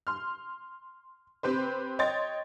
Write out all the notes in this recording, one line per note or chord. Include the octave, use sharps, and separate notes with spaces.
C6 F6
C4 G4 B4 C5
C#5 D#5 G5 C6 A6